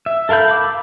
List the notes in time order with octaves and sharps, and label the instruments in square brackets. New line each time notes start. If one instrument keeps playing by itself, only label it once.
[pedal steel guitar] E5
A4 A#4 F5 B5 G6
F5 B5 D6 E6